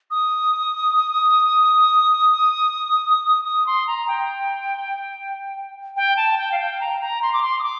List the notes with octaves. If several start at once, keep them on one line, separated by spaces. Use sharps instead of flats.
D#6
D#6
C6
A#5
G5
G5
A5
G5
F5
G5
A#5
A#5
C6
D6
C6
D#6
D6